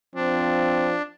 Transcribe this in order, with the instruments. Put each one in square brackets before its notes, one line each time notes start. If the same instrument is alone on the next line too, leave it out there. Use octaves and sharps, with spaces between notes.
[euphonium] F3 [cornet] C4 [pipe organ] D4